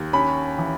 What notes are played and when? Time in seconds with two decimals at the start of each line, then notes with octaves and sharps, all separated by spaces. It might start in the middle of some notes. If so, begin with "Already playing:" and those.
Already playing: D#2
0.13 C#4 B5
0.58 E3